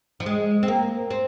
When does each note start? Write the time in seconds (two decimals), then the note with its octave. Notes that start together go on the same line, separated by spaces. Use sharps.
0.20 F3
0.26 G#3
0.63 C4
0.68 A#3
1.10 C4